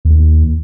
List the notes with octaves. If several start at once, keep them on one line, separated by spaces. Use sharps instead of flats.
D#2